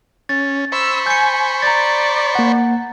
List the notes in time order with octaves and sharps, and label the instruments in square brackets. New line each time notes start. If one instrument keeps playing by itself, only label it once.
[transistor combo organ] C#4 [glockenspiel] A6
[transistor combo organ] C5 B5 C#6 [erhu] E6
[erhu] G#5 [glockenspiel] G6 C#7
[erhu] D5 [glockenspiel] A#5 A6
[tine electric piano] A#3 F#5